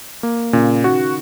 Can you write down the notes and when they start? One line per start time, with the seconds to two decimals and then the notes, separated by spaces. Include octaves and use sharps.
0.23 A#3
0.53 A#2 C#3
0.84 D#3 F#4